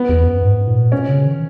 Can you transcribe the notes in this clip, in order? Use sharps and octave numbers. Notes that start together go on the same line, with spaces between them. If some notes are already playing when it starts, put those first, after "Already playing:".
Already playing: B3
E2
F#2
G#2
A#2
B2 C#4
C#3
D#3